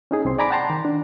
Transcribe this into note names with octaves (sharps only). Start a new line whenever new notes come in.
C#4 D#4 G#4
C2 C4 C6
D5 G#5 A#5 B5 D6
F#5 G5 A5 A#5 C6
D#3
D4